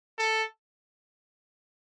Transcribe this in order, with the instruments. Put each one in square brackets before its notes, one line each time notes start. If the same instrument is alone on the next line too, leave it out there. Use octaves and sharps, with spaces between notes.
[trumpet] A4